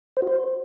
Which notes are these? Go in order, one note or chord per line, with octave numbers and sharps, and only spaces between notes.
C5
F#4
C5